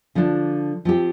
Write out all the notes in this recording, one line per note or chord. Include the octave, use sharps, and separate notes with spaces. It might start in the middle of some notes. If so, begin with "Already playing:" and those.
D3 F3 D4
F3 C4 G4